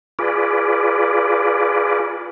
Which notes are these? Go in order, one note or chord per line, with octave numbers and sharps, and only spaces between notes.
F4 G#4 B4 D5